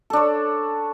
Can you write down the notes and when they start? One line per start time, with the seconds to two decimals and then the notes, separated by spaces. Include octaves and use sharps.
0.10 A4
0.13 D4
0.17 C#5